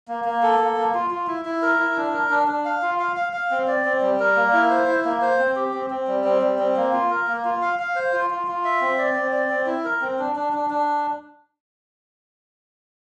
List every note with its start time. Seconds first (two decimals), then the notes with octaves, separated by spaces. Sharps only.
0.08 A#3
0.25 A#3
0.42 A4
0.59 A#3
0.76 A#3
0.94 F4
1.10 F4
1.27 E4
1.45 E4
1.62 A#4
1.79 E4
1.97 D4
2.13 A#4
2.30 D4
2.48 D4
2.65 F5
2.82 F4
2.99 F5
3.16 F5
3.33 F5
3.51 C4
3.68 D5
3.85 C4
4.02 G3
4.20 A#4
4.36 A#3
4.53 E4
4.71 C5
4.87 E4
5.05 A#3
5.22 C5
5.39 C4
5.56 G4
5.74 C4
5.90 C4
6.07 G3
6.24 C4
6.42 G3
6.59 C4
6.76 A#3
6.93 F4
7.10 A#4
7.27 A#3
7.45 F4
7.62 F5
7.79 F5
7.96 C5
8.13 F4
8.30 F4
8.47 F4
8.65 E5
8.81 C4
8.98 D5
9.15 C4
9.33 D5
9.50 C4
9.67 E4
9.85 A#4
10.02 C4
10.19 D4
10.36 D4
10.53 D4
10.70 D4